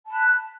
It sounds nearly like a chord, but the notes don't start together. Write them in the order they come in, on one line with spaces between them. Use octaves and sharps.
A5 B5 F#6